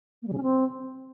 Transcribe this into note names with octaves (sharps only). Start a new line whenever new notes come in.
A#3
G3
C#3
C#4
C4